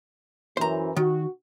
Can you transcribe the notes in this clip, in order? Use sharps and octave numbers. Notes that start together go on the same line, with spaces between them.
F#2 E3 C5 A#5
D#3 F#4